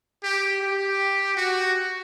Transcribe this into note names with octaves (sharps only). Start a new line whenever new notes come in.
G4
G4
F#4